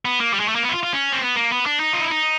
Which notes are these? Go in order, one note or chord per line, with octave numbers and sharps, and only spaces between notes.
B3
A#3
G3
G#3
A3
A#3
B3
E4
F4
F4
C#4
C4
B3
A#3
B3
D4
D#4
F4
E4
D#4